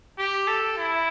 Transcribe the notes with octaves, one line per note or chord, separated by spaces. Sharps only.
G4
A4
E4